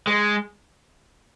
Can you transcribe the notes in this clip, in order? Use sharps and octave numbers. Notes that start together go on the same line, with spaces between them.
G#3